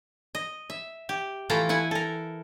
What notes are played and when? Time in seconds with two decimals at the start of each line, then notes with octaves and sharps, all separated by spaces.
0.35 D#5
0.70 E5
1.09 G4
1.49 E3 A3 E4 F4 A4 A#5
1.69 E4 F#5 G#5
1.91 A4 A#4